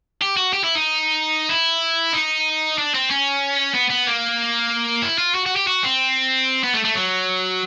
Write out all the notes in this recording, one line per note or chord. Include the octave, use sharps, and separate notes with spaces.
G4
F#4
G4
E4
D#4
E4
D#4
D4
C4
C#4
B3
B3
A#3
E4
F4
F#4
F#4
G4
F#4
C4
B3
A3
A3
F#3